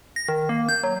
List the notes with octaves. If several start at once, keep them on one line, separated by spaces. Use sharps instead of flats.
A#6
D#3
A#3
G6
F#3